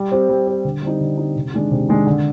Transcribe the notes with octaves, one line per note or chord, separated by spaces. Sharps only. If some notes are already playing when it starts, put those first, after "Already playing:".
Already playing: G3
C4 G4
G3
C4 G4
D3
G3 C4 D#4
D3
G3 C4 D#4
C3
D#3 G#3 D4
C3
D#3 G#3 D4
D3